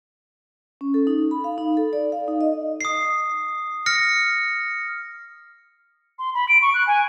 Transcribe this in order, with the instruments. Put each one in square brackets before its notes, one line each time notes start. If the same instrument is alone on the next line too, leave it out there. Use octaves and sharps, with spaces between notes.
[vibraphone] C#4
A4
D#4
B5
F5
D#4
A4
D5
F5
D#4
D#5
[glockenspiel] D#6 C7
F6 A#6 C#7
[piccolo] C6
B5
D7
C#6
F#6
G#5